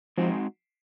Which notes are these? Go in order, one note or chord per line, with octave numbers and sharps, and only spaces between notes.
F3 G#3 C4 D#4 F#4